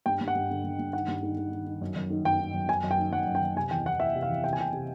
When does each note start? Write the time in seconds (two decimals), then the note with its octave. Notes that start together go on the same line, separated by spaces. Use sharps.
0.06 G2 G5
0.21 G2
0.28 F#5
0.35 G2
0.50 D3
0.64 G2
0.79 G2
0.93 D#3 F#5
1.08 G2
1.23 D#3
1.37 D#3
1.52 D#3
1.67 D#3
1.81 F#2
1.96 F#2
2.10 D#3
2.25 F#2 G5
2.39 D#3
2.54 F#2
2.68 F#2 G#5
2.84 F#2
2.91 G5
2.98 D#3
3.12 F#2 F#5
3.27 F#2
3.35 G5
3.42 F#2
3.56 C3 G#5
3.71 E2 G5
3.86 E2 F#5
4.00 E3 E5
4.15 C3
4.23 F5
4.29 E2
4.44 C3 G5
4.53 G#5
4.58 C3 G5
4.73 C3